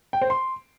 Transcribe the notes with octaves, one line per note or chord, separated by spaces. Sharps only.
G5
C5
C6